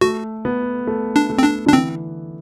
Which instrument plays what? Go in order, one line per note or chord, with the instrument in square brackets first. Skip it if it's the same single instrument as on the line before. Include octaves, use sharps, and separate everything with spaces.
[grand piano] A3 [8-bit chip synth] F#4
[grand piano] B3
A3
[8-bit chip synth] D4
[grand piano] A3
[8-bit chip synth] C4
D4
[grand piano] D3 [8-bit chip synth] D4
[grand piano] E3 [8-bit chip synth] C4